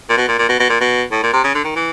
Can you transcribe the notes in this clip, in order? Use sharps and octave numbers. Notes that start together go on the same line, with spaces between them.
A#2
B2
A#2
A#2
B2
B2
A#2
B2
A2
A#2
C3
C#3
D3
D#3
E3